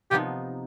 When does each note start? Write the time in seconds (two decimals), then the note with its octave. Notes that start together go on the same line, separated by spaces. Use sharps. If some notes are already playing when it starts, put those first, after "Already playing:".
0.11 C3 F3 B3 D#4 G4